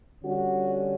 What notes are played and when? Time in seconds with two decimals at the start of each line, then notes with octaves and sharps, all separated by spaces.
0.24 D3 G3 C#4 F#4